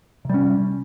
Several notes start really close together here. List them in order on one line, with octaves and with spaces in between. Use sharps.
C3 G3 C#4